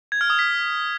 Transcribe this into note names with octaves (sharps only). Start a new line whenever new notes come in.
G#6
F6
D#6
B6